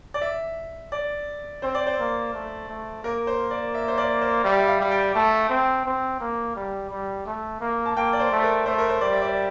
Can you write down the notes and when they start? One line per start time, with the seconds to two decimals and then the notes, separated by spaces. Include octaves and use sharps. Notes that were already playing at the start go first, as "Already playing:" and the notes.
0.14 D5
0.22 E5
0.92 D5
1.62 C4 C5
1.75 D5
1.87 C5
1.99 A#3
2.33 A3
2.68 A3
3.03 A#3 A#4
3.27 C5
3.51 D5
3.75 E5
3.88 C5
3.98 D5
4.21 C5
4.44 G3 E5
4.59 E5
4.68 F5
4.80 G3
4.91 G5
5.15 A3 A5
5.50 C4
5.86 C4
6.20 A#3
6.56 G3
6.91 G3
7.26 A3
7.60 A#3
7.86 A5
7.97 A#3 G5
8.13 D5
8.20 C5
8.32 A3
8.39 C5
8.43 A#4
8.66 A3 C5
8.78 A#4
8.89 C5
9.01 G3 D5
9.13 E5
9.22 D5